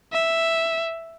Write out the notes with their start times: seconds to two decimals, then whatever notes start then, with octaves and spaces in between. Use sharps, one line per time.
0.13 E5